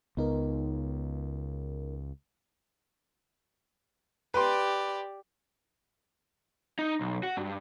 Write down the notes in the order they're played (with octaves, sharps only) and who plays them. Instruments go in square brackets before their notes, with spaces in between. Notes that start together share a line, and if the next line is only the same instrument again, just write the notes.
[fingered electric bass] C#2 [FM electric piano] B3 D#4 A#4
[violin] G4 D5 [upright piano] B4 C6
[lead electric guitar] D#4
B1
F#4
G2